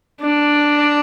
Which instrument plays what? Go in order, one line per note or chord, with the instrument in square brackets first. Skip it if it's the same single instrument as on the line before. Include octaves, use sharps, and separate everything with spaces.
[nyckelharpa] D4